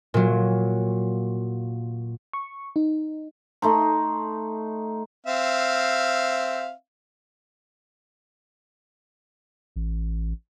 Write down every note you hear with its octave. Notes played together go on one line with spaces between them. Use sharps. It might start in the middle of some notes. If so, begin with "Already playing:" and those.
A#2 F#3
C#6
D#4
A3 D#4 C6
C4 E5 F5
A1